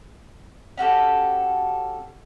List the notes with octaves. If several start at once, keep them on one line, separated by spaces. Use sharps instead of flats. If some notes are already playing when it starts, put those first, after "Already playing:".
C#4 F#4 G4 A4